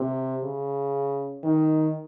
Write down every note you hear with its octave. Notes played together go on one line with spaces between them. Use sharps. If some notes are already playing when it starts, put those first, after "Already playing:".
Already playing: C3
C#3
D#3